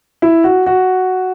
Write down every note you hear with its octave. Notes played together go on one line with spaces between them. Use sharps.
E4
F#4
F#4